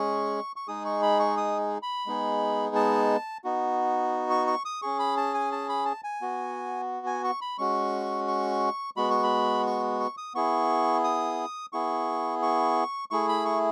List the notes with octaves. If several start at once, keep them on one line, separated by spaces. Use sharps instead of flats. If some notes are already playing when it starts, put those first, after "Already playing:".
Already playing: G#3 C#4 G#4 C#6
C#6
G#3 D#4 G#4 D#6
C#6
B5
C#6
D#6
B5
G#3 B3 D#4 G#4
A5
B3 D#4 F#4
C#6
C#6
D#6
C#4 G#4 C#6
B5
A5
G#5
A5
B5
A5
G#5
B3 F#4
G#5
C#6
B5
G#3 C#4 F#4 C#6
C#6
G#3 B3 F#4 B5
C#6
B5
C#6
C#6
D#6
B3 E4 G#4 C#6
D#6
B3 E4 G#4 C#6
C#6
A3 E4 G#4 C#6
B5
C#6